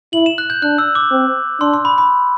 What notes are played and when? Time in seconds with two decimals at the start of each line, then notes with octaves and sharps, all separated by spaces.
0.13 E4 F#7
0.26 E7
0.38 F#6
0.50 G6
0.62 D4 F#6
0.78 E6
0.95 D6
1.11 C4
1.60 D4 C6
1.73 C6
1.85 B5
1.98 B5